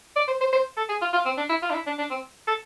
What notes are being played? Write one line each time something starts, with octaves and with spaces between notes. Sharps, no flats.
D5
C5
C5
C5
A4
G#4
F4
F4
C4
D4
E4
F4
D4
E4
D4
D4
C4
A4